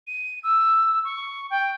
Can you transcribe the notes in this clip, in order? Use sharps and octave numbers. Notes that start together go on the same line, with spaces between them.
D#7
E6
C#6
G5